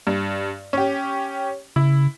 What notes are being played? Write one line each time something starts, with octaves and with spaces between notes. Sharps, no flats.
G2
C#4 G4
C#3 E4